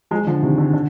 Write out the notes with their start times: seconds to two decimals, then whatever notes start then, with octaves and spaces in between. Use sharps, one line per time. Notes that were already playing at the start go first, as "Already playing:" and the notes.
0.11 F3 G#3
0.27 D3 F3
0.42 C3 D#3
0.58 D3
0.73 D3